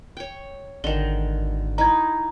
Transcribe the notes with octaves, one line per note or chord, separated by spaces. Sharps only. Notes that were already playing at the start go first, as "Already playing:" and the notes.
C#5 G5
G#1 D3 D#3 G7
D#4 E4 A#5 G#6